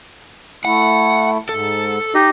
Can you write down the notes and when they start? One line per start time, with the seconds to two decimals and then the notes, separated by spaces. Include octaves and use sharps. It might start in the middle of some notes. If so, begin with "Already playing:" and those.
0.65 A3 E4 F#5
1.49 G#2 A4
2.15 D#4 G4 D#5